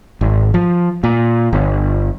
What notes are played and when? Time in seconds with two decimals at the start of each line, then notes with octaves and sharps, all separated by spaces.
0.21 G#1
0.54 F3
1.04 A#2
1.53 G1